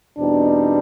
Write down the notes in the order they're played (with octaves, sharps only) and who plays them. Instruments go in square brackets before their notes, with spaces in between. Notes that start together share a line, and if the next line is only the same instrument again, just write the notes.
[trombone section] E2 B2 G3 C4 D#4 [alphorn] D4